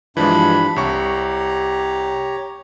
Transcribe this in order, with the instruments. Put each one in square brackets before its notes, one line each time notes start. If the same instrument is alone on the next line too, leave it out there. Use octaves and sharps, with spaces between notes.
[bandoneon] G2 D4 B5 [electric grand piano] E3 F3 G#3
[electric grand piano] C2 C#6 [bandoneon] G4 C#5 A#5